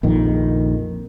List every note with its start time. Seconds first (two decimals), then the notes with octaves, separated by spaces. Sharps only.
0.03 A#1 F2 D#3